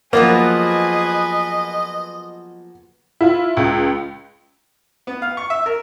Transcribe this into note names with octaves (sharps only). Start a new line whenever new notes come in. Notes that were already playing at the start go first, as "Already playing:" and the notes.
F3 F#3 A#3 B3 G#4 B4 D#5
E4 F4
C#2
B3
F5
C#6
E5
A#4